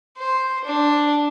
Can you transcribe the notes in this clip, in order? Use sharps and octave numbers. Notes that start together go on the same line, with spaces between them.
C5
D4